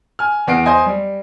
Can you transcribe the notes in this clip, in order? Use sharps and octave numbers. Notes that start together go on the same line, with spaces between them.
G#5 F6
E2 B3 C7 D7
C5 D#5 G#5
G3